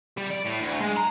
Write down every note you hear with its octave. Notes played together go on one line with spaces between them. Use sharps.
G3
D5
A2
D2
G#3
A#5